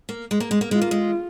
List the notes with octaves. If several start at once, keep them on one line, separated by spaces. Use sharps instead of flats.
A#3
G#3
A#3
G#3
A#3
G#3 F4
A#3
G#3